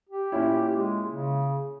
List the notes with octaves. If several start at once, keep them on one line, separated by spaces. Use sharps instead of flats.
G4
A#2 C#4 E4
G#3
C#3